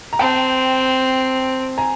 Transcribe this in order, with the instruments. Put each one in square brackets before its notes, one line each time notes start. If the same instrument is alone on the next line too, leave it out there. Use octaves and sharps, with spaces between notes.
[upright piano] A#5
[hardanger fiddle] C4 [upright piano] G5 A5
[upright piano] G#5 A#5